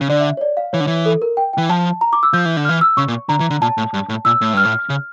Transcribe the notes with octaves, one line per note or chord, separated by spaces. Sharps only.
C#3
D3 D5
E5
C#5
D5
F5
E3 C#5
D3
E3
A4
A#4
G5
E3 G5
F3 A5
A#5
D6
E6
F3 G6
E3
D3
E3 F6
E6
C#3 C#6
A#2
D3 A#5
E3
D3
A#2 A5
A2
G2
A2
A#2 E6
A2
G2 F6
A2
C#3